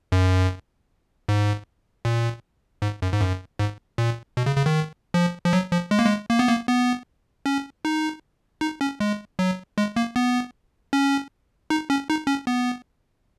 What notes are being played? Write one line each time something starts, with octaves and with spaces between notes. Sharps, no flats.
F#2
G#2
A#2
G#2
F#2
G#2
F#2
G#2
A#2
B2
C#3
C#3
D#3
F3
F3
F#3
F3
G#3
A#3
G#3
A#3
B3
A#3
B3
C#4
D#4
D#4
C#4
G#3
F#3
G#3
A#3
B3
C#4
D#4
C#4
D#4
C#4
B3